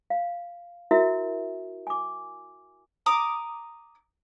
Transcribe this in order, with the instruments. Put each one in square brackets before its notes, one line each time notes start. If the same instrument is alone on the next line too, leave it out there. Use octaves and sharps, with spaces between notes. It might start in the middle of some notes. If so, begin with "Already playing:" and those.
[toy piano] F5
E4 F#4 A#4 E5
G#5 D6
[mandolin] A#5 D6 D#6